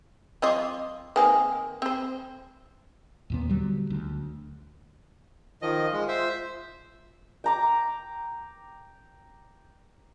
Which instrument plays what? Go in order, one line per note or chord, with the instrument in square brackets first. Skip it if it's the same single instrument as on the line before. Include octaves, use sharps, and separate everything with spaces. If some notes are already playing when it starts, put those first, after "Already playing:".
[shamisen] C4 F4 D#5 [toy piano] A5 C6 D6
[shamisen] D#3 A#3 C4 [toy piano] B4 G#5 D#6
[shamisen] C4 C5
[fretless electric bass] D#2 A#2 B3
D3 F#3 G3
D2
[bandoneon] D#3 F3 D#5 [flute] F4
[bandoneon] G#3
C5 E5
[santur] G5 A#5 D6